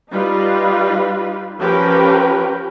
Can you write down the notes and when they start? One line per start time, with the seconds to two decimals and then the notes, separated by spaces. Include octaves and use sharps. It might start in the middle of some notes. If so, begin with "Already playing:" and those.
0.11 G3 D#4 F4 B4
1.59 F3 C#4 G4 A#4 B4 G5